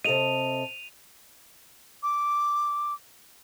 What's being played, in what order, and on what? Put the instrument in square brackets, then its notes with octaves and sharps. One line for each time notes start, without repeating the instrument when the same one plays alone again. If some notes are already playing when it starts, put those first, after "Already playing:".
[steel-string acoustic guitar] C3 A4 D#5 [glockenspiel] D#7 F7
[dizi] D6